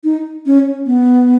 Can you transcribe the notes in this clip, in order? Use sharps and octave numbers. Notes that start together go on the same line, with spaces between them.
D#4
C#4
B3